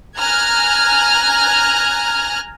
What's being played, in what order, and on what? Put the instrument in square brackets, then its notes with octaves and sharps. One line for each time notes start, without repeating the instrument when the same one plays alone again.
[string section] G#5 A#5 F6 F#6 G#6